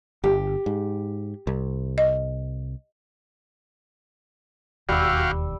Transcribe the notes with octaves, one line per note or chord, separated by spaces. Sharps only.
G1 G4
G#2
C2
D#5
E1 D#2 G3 F#4 G4 F5 E6